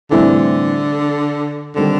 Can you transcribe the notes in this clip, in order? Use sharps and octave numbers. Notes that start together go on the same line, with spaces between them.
A2 D3 E3 G3 C4 E4
D3 D#3 G3 C4